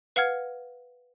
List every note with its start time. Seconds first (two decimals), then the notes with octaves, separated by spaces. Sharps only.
0.16 B4 F5 F#5 F6 G#6